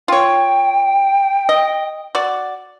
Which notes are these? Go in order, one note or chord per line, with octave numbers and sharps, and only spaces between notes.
F4 C#5 G5
D#5
F#4 D5